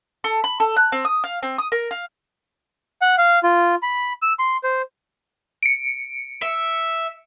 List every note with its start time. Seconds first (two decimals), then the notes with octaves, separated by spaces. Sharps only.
0.24 A4
0.44 B5
0.60 A4
0.76 F#6
0.92 C4
1.05 D#6
1.24 F5
1.43 C4
1.58 D#6
1.72 A#4
1.91 F5
3.02 F#5
3.18 F5
3.43 F4
3.83 B5
4.22 E6
4.39 C6
4.64 C5
5.63 C#7 D7
6.42 E5